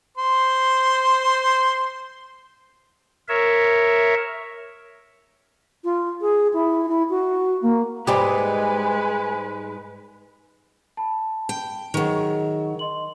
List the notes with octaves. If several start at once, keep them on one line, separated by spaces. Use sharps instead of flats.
C5 C6
A#4 C#5 E5
F4
G#4
E4
E4
F#4
A#3
G#2 G3 G#3 G4 B4 G#5
A5 B5
G5
D#3 F#3 G#4
D#5 C6 F#7